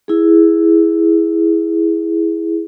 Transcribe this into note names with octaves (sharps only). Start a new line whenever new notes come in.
E4 G#4